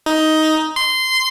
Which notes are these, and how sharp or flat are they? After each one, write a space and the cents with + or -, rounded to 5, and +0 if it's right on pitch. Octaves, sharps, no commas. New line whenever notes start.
D#4 +10
C6 -15